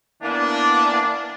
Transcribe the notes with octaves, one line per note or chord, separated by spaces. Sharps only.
E3 A#3 B3 D4